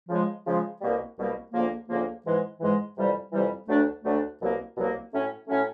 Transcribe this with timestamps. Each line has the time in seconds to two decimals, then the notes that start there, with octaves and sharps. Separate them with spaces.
0.09 C#3 F3 G#3
0.45 C#3 F3 G#3
0.81 C2 B2 G3 A#3
1.17 C2 B2 G3 A#3
1.53 D2 C#3 F3 A#3
1.89 D2 C#3 F3 A#3
2.25 G#2 E3 G#3
2.61 G#2 E3 G#3
2.97 F2 C3 E3 G3
3.33 F2 C3 E3 G3
3.68 D2 D3 F#3 A3 D4
4.04 D2 D3 F#3 A3 D4
4.40 C2 B2 F#3 A#3
4.77 C2 B2 F#3 A#3
5.13 A2 F#3 A3 C#4
5.48 A2 F#3 A3 C#4